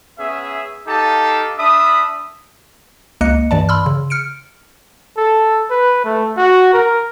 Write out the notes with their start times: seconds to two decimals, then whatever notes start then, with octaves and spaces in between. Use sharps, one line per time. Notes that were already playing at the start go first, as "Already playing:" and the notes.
0.18 B3 C#4 G#4 E5
0.86 D#4 G4 A4 F5 A5 D6
1.58 D4 E5 B5 D#6
3.21 C#2 A#3 D#5 F#6 C#7
3.51 G2 E3 D5 A5
3.69 B5 C6 E6 F6
3.86 C#3
4.10 F6 C#7 D7
5.17 A4
5.71 B4
6.05 A3
6.37 F#4
6.73 A#4